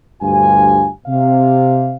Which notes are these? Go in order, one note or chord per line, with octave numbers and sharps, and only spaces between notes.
D2 G2 F4 G4 G#5
C3 F5